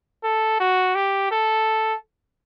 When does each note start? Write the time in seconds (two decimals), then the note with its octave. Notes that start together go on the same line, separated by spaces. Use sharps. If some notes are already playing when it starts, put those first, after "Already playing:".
0.24 A4
0.60 F#4
0.95 G4
1.31 A4